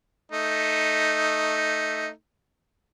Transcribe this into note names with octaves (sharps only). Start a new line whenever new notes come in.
A3 D#4